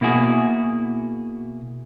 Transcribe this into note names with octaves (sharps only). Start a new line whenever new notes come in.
B2 A#3 E4 F#4 G#4